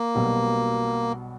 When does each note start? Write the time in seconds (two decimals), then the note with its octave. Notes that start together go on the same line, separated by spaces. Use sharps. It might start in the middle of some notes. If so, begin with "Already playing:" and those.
Already playing: A#3
0.15 B1 B2 G3 B3